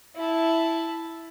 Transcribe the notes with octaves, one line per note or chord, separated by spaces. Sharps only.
E4 A5